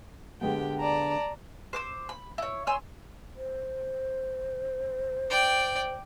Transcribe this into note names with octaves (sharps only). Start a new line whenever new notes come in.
D3 G#3 B3 G4 G5
D5 A5 A#5
C5 D6 E6
B5
E4 C#5
C#5 G#5 C6 E6
C5
D5 G5